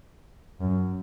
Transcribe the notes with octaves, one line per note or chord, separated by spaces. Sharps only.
F#2